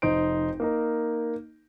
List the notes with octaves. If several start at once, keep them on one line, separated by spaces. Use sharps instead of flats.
F1 D#4 C5 D7
A#3 D#4 A#4